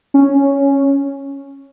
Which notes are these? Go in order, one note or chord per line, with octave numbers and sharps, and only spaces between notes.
C#4